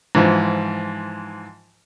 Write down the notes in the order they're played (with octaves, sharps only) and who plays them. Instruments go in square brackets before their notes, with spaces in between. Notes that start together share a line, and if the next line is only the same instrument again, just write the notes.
[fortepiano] G#2 E3 F3